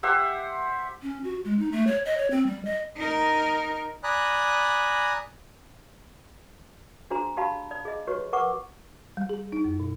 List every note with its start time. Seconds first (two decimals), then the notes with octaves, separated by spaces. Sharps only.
0.03 G4 C5 E5 F#5
1.02 C#4
1.24 F#4
1.45 G#3
1.59 D#4
1.72 A3
1.87 C#5
2.05 D#5
2.17 C#5
2.31 C4
2.47 G3
2.65 D#5
2.96 D#4 A#4
4.04 D5 G#5 A#5 B5 D#6 F#6
7.10 D4 F#4 G#4 C5 A#5 C6
7.37 F#4 G4 D5 F5 A5 B5
7.71 D5
7.85 G#4 D#5
8.07 F#4 G4 B4 C#5 C#6
8.33 A#4 B4 F#5 C#6 D6
9.17 G3
9.29 G#4
9.52 D#4
9.64 F#2
9.80 B2